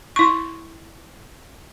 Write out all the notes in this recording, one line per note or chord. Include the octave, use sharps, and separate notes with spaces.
E4 C#6